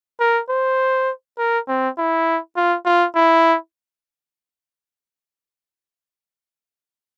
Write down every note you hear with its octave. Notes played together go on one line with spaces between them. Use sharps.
A#4
C5
A#4
C4
E4
F4
F4
E4